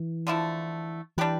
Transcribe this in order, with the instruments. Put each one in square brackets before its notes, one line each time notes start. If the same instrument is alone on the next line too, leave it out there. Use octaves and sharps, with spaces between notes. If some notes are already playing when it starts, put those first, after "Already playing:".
Already playing: [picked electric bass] E3
[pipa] D3 F3 A3 E4
[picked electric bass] E3 [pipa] G3 D4 G4 B4